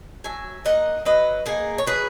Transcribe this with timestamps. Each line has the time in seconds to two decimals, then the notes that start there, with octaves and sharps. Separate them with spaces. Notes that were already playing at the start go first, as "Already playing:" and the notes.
0.24 F#3 E5 G#5
0.65 A#3 D#4 D#5 F#5
1.05 F#3 B4 D#5
1.46 A#3 D#4 G#4
1.78 C#5
1.87 F#3 G#4 B4